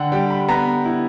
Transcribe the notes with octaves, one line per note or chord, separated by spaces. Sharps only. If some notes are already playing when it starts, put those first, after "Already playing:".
Already playing: D3 F#5 G5
G3 G5
B5
B3 A#5
E4